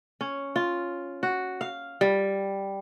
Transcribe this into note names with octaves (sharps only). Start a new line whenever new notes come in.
C#4
F4
F#4
F5
G3